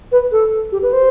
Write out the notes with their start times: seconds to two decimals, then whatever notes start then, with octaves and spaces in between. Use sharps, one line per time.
0.12 B4
0.32 A4
0.72 G4
0.82 B4
0.93 C5